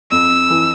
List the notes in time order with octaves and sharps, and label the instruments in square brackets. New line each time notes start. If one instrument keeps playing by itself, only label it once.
[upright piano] F2 [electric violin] E6
[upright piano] E3